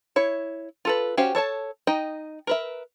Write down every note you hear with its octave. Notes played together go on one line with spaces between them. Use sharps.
E4 C#5
F4 A4 B4
C#4 F#4 G4 C5 F5
A4 C#5 D#5 A5
D#4 D#5 G5
A#4 B4 E5